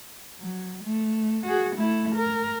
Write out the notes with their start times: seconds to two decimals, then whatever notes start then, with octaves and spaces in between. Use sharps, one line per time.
0.39 F#3
0.84 A3
1.46 F#4 G#4
1.76 A3 E4
2.15 A#4